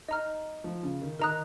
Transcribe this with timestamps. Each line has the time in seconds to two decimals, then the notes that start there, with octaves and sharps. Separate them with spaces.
0.08 D#4 D#5 A#5 F6
0.64 F3
0.83 C#3
1.02 D#3
1.19 D#3 A#4 D#5 A#5 D#6 F#6